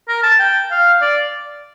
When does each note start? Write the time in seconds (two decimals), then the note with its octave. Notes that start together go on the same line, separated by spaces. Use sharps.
0.08 A#4
0.23 A5
0.39 G5
0.71 F5
1.02 D5